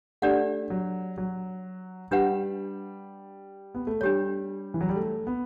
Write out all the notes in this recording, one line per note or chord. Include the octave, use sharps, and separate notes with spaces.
A3 D4 G4 D5 F#5
F#3
F#3
G3 D4 G4 B4 F#5
B3
A3
G3 D4 G4 C#5
E3
F#3
G3
A3
B3